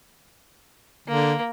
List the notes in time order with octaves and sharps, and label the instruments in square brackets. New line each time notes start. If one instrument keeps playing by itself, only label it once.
[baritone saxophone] D3 [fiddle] A#3